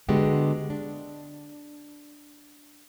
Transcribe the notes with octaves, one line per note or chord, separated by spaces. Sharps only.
D3 G#3 B3 F#4 G4
D4